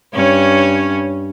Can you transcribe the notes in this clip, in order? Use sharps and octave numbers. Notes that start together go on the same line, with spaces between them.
G2 C#4 C#5